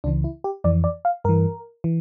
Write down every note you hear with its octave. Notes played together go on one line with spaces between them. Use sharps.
C#2 C#3 E3 D4
E4
G4
F2 E3 D5
D5
F5
G2 E3 A#4
E3